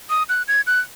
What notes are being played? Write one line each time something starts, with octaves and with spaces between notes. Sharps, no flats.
D#6
F#6
G#6
F#6